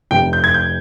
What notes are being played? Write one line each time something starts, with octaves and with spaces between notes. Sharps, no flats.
F1 F2 C3 G5
G6
G#6
G6